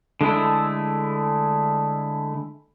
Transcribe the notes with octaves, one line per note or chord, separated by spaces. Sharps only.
D3 G#3 A3 E4